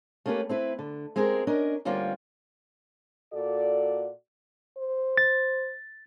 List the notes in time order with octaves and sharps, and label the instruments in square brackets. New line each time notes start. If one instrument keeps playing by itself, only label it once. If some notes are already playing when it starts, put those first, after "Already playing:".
[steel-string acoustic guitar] A3 A#3 C#4 F4 G4 B4
C4 E4 B4
D3
G#3 C4 G4 G#4 A#4
C#4 D4 A#4 D#5
D2 G3 A#3 C#4 F4 G5
[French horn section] A#2 F#4 A4 D5
[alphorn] C5
[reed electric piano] A6